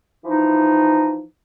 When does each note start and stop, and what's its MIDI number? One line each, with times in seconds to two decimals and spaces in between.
0.25 1.22 52
0.25 1.22 53
0.25 1.22 63